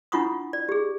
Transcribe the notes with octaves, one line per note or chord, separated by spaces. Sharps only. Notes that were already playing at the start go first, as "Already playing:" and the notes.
D4 E4 F4 F#5 C#6 D#6
D5
G4 G#4